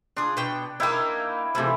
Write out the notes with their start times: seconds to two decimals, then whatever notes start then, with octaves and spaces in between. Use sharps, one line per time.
0.17 D4 F4 G#4
0.37 B2 C#5 G5
0.80 A#3 D#4 E4 G5
1.55 C3 E3 F3 A3 E4